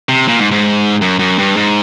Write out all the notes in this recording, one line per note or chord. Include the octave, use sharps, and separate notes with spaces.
C3
A#2
G#2
G#2
F#2
F#2
G2
G#2